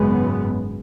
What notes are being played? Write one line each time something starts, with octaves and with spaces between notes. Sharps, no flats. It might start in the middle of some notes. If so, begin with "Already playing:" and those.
Already playing: G#1 F#2 C#3 G#3 B3